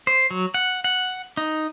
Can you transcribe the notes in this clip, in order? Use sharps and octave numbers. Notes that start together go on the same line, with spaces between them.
C5
F#3
F#5
F#5
D#4